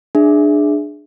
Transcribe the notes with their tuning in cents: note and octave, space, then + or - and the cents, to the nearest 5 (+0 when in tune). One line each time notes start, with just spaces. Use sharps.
D4 +15 G#4 +0 E5 +0